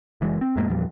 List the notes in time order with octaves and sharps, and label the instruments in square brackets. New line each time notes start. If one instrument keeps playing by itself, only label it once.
[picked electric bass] F#1 E3 G#3
C4
F2 A2 G#3 A#3
E2 A#2 F3 G3